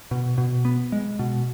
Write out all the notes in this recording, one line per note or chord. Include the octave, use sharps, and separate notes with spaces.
B2
B2
B3
G#3
B2